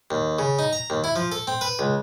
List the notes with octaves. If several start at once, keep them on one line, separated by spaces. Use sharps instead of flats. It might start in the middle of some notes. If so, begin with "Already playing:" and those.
D#2
C#3
D#4
A#5
D#2
E4
F3
A4
C4
B4
C#2